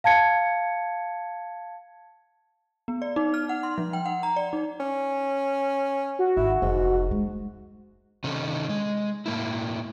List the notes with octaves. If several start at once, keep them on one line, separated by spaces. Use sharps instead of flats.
F5 A5 G#6 C#7
B3
D5
D#4
F6
F#5
C6
F3
G5
F#5
A#5
D5
D#4
C#4
F#4
G#1 E4
F1 G#2
G#3
C3 D#3 C#4 D#4 A4
G#3
A2 A#3 E4